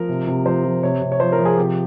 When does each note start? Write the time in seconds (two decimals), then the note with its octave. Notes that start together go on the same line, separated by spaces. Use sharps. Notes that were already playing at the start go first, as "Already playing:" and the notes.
Already playing: F3 A#4
0.09 C3
0.27 C3
0.46 F3 C5
0.64 F3
0.83 C3 C#5
1.01 C3
1.12 C#5
1.20 F3 C5
1.32 A#4
1.39 F3
1.45 G#4
1.57 C3 G4